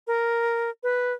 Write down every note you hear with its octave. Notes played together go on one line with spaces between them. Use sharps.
A#4
B4